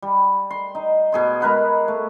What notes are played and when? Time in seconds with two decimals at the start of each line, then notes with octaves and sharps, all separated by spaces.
0.02 G3
0.50 C6
0.75 D#4
1.12 B2 G#4 C6
1.41 G#3 A#4 B4 F#5
1.88 A3